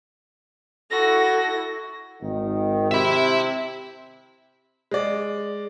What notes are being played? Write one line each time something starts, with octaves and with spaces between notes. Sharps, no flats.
E4 F#4 A4 A#6
G#1 D#3
C3 E5 B5
G#3 D5